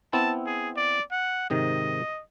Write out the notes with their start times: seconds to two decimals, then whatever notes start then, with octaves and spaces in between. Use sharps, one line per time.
0.13 B3 C4 E4 A5
0.46 G#4
0.76 D5
1.11 F#5
1.50 G#2 C3 D#3 D#5